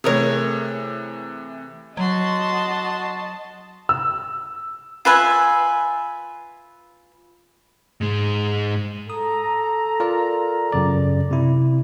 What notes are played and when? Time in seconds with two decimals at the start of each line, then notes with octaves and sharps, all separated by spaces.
0.04 C3 E3 A3 G#4 A#4 C#5
1.97 F#3 F#4 D#5 A5 C6
3.89 E6
5.05 F4 B4 E5 G#5
8.01 G#2 G#3
9.10 A4 A#5 D#6
10.00 F4 A#4 D5
10.72 F#2 C#3 D5
11.31 C3 E4